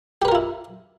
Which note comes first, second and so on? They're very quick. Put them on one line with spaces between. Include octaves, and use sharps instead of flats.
G4 B4 A#4 F4 E4